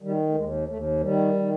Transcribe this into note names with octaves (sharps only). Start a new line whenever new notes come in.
D#3 G3
A3
D#2 G#3
D#2 A3
D#3 G3
D#3